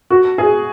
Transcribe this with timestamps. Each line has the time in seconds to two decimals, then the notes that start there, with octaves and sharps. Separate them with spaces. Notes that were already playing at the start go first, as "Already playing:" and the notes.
0.10 F#4
0.38 G#4